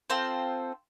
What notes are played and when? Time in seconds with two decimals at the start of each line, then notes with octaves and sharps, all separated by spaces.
0.10 C4 F4 A4 C5